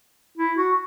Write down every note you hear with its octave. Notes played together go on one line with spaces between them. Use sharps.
E4
F#4